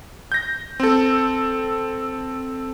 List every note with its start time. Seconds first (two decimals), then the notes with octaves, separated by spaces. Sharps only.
0.32 G6 A#6
0.80 C4 A4